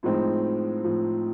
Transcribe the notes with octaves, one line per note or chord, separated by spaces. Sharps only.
A2 F3 G#3 C4 D#4
A2 F3